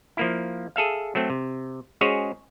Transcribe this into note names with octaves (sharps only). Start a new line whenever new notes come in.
F3 A#3 E4
G#4 A4 E5 F5
F#3 A3 C4
C3
G#3 C#4 F#4 G#4 C5 C#5